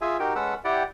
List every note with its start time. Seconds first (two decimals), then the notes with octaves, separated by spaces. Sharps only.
0.01 F4 G#4 E5 G#5
0.19 D#4 F#4 G4 A#4 G5
0.35 G#3 C#4 A4 B4 F#5 E6
0.64 E4 G4 D5 F#5 G5